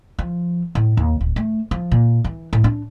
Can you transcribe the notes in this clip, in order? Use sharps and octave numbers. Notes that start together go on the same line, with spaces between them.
F3
A2
D#2
D1
A3
F3
A#2
E3
A2
D4